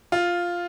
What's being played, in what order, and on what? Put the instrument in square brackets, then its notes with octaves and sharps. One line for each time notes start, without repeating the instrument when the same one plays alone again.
[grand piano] F4